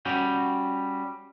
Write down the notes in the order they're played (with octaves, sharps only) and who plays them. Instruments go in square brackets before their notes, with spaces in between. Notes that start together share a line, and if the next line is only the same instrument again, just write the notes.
[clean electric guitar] G3 C#4 F#4 G5